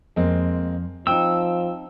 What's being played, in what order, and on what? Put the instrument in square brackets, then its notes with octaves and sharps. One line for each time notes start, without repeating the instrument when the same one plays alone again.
[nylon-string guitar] F2 [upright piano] G#3 A#3 C4
[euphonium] F3 [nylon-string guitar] C4 D#4 [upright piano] G5 [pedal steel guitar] E6